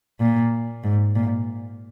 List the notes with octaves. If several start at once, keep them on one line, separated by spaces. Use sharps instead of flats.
A#2
G#2
A#2